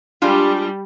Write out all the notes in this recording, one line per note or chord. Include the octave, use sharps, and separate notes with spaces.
G3 G#3 D4 F4